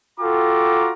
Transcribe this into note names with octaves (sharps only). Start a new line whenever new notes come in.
F4 F#4 A4 G5 A#5 D6